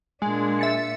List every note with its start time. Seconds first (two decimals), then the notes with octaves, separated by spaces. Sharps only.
0.22 A#2 G#3 D4
0.59 E5 A6 C#7